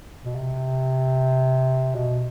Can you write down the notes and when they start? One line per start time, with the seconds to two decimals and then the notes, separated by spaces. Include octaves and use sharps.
0.25 B2
0.35 C3
1.95 B2